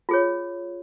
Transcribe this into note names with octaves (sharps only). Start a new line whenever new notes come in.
F4 G#4 C#5